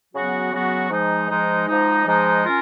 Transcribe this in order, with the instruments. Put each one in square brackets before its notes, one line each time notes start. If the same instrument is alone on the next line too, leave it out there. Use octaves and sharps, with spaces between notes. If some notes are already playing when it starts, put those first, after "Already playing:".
[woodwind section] C#3 F#3 B3 F#4
C#3 F#3 B3 F#4
G#2 F3 G#3 D#4
G#2 F3 G#3 D#4
G#2 F3 G#3 D#4
G#2 F3 G#3 D#4
C#4 F4 A#4